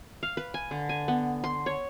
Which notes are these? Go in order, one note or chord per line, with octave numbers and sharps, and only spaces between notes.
F5
B4
G#5
D3
G#5
B3
C6
C#5